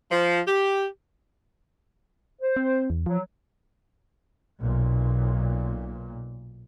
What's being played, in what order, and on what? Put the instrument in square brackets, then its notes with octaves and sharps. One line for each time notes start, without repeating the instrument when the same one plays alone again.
[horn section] F3
G4
[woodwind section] C5
[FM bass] C4
E2
[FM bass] F3 [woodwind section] F#3
[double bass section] B1 A#2